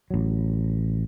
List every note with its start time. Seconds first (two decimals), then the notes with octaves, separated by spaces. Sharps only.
0.10 A1 F#3